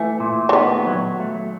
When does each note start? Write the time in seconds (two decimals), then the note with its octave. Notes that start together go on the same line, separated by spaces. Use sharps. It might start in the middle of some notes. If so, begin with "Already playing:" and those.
Already playing: E3 A3
0.20 A#2
0.49 E3
0.53 D#3 B3
0.87 F#3
1.20 A3